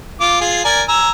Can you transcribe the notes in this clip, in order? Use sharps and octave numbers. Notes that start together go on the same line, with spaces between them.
F4 D6
F4 G#4
A#4 D5 G#5
G#5 A#5 E6